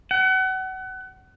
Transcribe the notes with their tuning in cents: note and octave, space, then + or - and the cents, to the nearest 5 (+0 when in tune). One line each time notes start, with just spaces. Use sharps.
F#5 +30